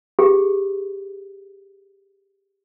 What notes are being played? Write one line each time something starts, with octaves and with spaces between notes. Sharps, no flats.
G4 G#4